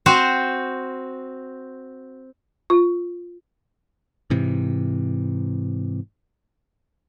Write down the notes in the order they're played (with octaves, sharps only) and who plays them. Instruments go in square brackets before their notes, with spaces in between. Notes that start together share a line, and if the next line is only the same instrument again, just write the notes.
[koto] C4 F#4 C5
[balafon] F4
[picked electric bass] G#2 C3 E3